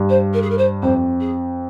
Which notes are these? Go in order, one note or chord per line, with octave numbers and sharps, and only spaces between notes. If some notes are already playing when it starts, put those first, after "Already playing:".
Already playing: G2
C5
A#4
G#4
A#4
C5
F2 C5
G#4